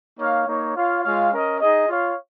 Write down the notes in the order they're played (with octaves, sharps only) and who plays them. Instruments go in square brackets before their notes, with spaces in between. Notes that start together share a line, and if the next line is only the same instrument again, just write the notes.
[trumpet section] A#3 D#4 C#5 F5
A#3 D#4 C#5
F4 C#5 F5
G#3 F4 C#5 F5
C#4 A#4 D#5
D#4 G#4 D#5
F4 C#5 F5